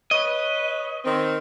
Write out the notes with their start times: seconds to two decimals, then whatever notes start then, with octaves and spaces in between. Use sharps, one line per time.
0.11 B4 C#5 D#5
1.05 D#3 C4